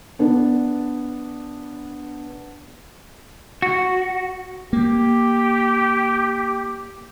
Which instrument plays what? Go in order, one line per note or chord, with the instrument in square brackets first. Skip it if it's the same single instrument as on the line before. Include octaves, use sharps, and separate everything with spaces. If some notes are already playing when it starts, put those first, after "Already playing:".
[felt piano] B3 D4
[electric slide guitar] F#4
[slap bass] A#3 [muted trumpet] G4